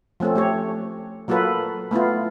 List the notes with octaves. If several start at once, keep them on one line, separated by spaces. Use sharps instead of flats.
F3 A3 C4 C#4 A4
A3 G4 C#5
F#3 A#3 F4 F#4 A4 B4
A3 B3 E4 F4